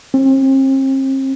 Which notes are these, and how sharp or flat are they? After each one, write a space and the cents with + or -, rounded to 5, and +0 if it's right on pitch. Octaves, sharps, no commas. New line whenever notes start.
C4 +40